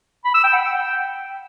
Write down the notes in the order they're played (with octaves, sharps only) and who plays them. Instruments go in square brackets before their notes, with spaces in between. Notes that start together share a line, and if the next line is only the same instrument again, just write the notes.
[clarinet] B5
E6
G5
F#5
G5